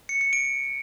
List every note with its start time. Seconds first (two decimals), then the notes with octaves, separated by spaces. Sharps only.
0.09 C#7
0.21 C#7
0.33 D7